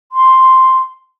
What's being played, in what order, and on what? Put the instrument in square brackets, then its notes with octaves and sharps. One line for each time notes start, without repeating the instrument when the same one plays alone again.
[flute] C6